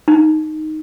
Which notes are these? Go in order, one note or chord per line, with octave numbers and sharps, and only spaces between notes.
D#4